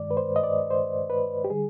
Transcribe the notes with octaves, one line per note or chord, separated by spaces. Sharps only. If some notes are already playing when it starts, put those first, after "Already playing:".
Already playing: G2 D#3 G#3 D5
B4
C5
D#5
D5
C5
B4
G4
D3 G3 G#4